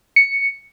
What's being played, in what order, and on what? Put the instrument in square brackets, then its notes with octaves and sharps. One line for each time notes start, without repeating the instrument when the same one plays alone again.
[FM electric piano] C#7